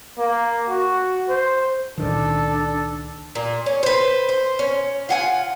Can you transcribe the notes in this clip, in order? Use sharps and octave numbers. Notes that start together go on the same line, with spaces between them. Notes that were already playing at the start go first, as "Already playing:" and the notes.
A#3
F#4
C5
C#2 A#2 D#3 D4 A4
A#2
C#4
B4 C5
C5
C#4
F4 F#5 G#5